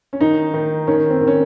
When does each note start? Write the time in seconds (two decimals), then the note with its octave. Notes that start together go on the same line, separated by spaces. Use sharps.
0.13 C#4
0.21 D#3 D#4
0.54 D#3 D#4
0.87 D#3 C#4
1.10 C4
1.21 D#3
1.27 C#4